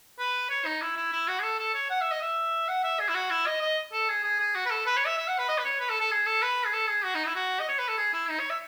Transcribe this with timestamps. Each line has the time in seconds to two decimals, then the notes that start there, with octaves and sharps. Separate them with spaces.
0.19 B4
0.50 C#5
0.65 D#4
0.81 E4
0.97 E4
1.12 E4
1.28 F#4
1.39 G#4
1.43 A4
1.59 A4
1.74 C#5
1.90 F#5
2.01 E5
2.11 D#5
2.22 E5
2.68 F#5
2.83 E5
2.99 G#4
3.09 E4
3.15 F#4
3.31 E4
3.47 D#5
3.62 D#5
3.93 A4
4.08 G#4
4.24 G#4
4.40 G#4
4.55 F#4
4.66 B4
4.70 A4
4.86 B4
4.97 C#5
5.06 E5
5.18 E5
5.28 F#5
5.38 B4
5.49 D#5
5.58 B4
5.65 C#5
5.80 B4
5.90 A4
6.00 A4
6.11 G#4
6.26 A4
6.42 B4
6.66 G#4
6.73 A4
6.89 G#4
7.04 F#4
7.15 D#4
7.26 E4
7.36 F#4
7.59 D#5
7.69 C#5
7.78 B4
7.88 A4
7.98 G#4
8.13 E4
8.29 D#4
8.40 C#5
8.50 E5